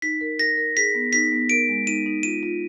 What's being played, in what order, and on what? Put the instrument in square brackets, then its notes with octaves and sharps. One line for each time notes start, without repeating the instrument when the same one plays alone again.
[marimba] D#4 [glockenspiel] B6
[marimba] A#4
[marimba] A#4 [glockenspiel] A#6
[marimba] A#4
[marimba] G#4 [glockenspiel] B6
[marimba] B3
[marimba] D#4 [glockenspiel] B6
[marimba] B3
[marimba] A#4 [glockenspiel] D7
[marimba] G#3
[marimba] D#4 [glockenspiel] D#7
[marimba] D#4
[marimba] F4 [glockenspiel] D#7
[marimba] F4